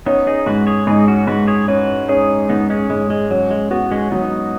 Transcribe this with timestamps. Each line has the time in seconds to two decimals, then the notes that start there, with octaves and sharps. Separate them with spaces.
0.06 B3 C#4 D#4
0.27 D#4 G#4
0.46 G#2 F#4 B4
0.67 G#4 C#5
0.87 G#2 D#4 G#4
1.07 C#4 F#4
1.27 G#2 F#4 B4
1.48 G#4 C#5
1.68 C#4 F#4 B4
2.08 C#4 D#4 G#4
2.49 G#2 B3 D#4
2.70 G#3 C#4
2.90 G#2 G#3
3.10 G#3
3.30 F#3 C#4
3.51 G#3
3.71 B3 F#4
3.91 G#3 C#4
4.11 F#3 B3 D#4